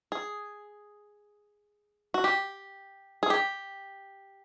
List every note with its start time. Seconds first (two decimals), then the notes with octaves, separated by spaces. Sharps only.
0.12 G#4
2.14 F#4
2.24 G4
3.23 G#4
3.30 G4